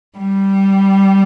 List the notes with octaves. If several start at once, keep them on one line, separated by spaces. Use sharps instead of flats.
G3